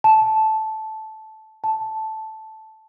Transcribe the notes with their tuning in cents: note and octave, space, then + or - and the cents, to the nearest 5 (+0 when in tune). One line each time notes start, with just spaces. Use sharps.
A5 -10
A5 -5